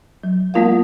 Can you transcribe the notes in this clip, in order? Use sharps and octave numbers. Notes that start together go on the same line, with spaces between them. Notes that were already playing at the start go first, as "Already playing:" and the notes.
F#3
G#3 A#3 B3 F4 A#4 F5